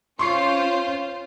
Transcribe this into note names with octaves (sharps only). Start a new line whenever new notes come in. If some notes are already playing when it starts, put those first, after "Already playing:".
C#4 F4 C5 C6 C#6 C7